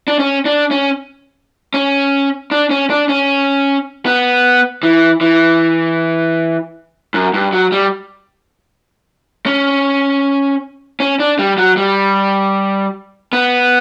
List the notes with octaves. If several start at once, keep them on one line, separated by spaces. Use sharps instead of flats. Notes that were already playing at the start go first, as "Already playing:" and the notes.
D4
C#4
D4
C#4
C#4
D4
C#4
D4
C#4
B3
E3
E3
F#2
G2
F#3
G3
C#4
C#4
D4
G3
F#3
G3
B3